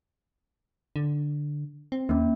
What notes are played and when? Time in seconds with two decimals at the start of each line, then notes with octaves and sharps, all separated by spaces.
0.96 D3
1.92 C4
2.09 D#2 A#3 C#4